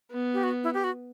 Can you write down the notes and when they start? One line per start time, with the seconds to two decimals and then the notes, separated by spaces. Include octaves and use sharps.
0.11 B3
0.34 G4
0.43 F#4
0.64 E4
0.74 G4
0.84 F#4